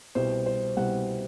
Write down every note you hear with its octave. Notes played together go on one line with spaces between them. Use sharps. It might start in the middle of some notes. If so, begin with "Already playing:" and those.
C2 B2 G3 C5
C5
C2 B2 G3 F#5